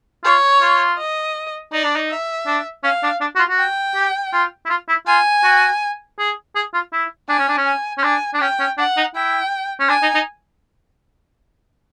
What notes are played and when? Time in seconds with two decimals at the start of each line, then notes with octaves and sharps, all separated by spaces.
0.24 F4 C#5
0.61 F4
0.98 D#5
1.73 D#4 D5
1.84 D4
1.96 D#4
2.10 E5
2.47 D4
2.84 C#4 F5
3.03 D4
3.21 D4
3.36 F#4
3.39 F4
3.49 F#4
3.59 G5
3.95 G4
4.33 F4
4.65 E4
4.70 F4
4.89 E4
5.07 F4 G#5
5.44 F#4
6.19 G#4
6.56 G#4
6.74 F4
6.93 E4
7.29 D4 G#5
7.39 C#4
7.49 D4
7.58 C#4
7.67 G#5
7.98 C#4
8.04 D4 G#5
8.34 D4
8.41 C#4 G5
8.60 C#4
8.78 D4 F#5
8.97 D#4
9.15 E4 G5
9.80 C#4
9.89 D4 G#5
10.03 D#4
10.15 D#4